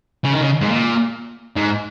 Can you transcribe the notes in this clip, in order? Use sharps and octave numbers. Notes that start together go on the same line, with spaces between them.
C#3
D#3
C#3
G#2
A#2
G#2